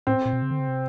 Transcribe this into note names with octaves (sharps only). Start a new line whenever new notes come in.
A2 C4
A#2
B2
C#3
D3
C#3
C3